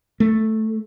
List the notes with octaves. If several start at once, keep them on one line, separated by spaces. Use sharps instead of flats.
A3